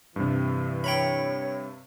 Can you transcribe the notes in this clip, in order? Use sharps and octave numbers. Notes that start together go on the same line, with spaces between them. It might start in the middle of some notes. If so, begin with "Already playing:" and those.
G2 C3 E3
C#5 G5 A#5 B5